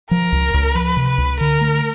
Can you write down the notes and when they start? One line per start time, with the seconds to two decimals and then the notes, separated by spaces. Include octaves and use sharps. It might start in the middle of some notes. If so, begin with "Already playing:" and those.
0.11 F3 A#4
0.32 C#2
0.54 C#2
0.75 F3 B4
0.96 C3
1.08 B4
1.18 C#2
1.40 D3 A#4
1.61 A3